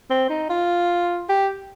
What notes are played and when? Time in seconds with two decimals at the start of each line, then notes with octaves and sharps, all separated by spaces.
0.10 C4
0.29 D#4
0.49 F4
1.29 G4